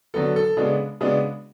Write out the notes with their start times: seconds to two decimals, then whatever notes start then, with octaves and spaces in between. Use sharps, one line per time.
0.14 D3 F#3 B3 A4
0.36 A4
0.57 C#3 G#3 B3 D4
1.01 C#3 G#3 B3 D4